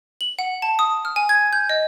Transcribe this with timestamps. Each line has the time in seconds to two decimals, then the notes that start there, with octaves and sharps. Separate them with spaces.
0.21 F#7
0.39 F#5
0.62 A5
0.79 D#6
1.05 F6
1.16 G#5
1.29 G#6
1.53 G6
1.69 D#5